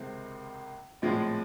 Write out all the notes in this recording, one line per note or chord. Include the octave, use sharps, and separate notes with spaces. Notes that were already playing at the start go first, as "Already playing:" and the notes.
Already playing: C#2 C3 D#3 G#3 C4
A#1 A2 F3 G#3 C4